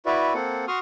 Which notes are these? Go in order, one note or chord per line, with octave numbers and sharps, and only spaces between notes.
E4 F#4 B4 D5 E5
A#3 C4 A4 F#5
F#4 C6 C#6 D#6 F6